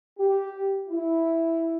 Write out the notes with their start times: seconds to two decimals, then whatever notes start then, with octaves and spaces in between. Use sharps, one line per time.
0.18 G4
0.88 E4